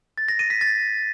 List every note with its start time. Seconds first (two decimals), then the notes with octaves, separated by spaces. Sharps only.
0.18 A6
0.28 A#6
0.39 D#7
0.50 B6
0.61 A6